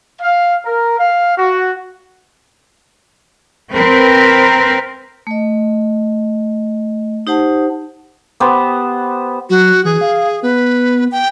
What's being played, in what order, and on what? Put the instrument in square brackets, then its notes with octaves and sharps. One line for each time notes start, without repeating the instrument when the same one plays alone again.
[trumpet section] F5
A#4
F5
F#4
[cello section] C4 A#4 B4
[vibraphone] A3 D#5
D#4 G4 C5 F#5 A5
[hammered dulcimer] B3 G4 B4 C5
[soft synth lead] F#3 [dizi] F#4
[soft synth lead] E3 [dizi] G#4
[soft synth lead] F5
[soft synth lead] B3 [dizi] B4
[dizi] G5